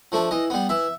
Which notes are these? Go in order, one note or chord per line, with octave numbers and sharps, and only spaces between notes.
F3 A3 D4
E3 D#5
G3 B3
E3 E5